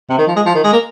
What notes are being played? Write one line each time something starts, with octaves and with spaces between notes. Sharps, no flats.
C3
D#3
F3
G#3
F3
D#3
G#3
A#3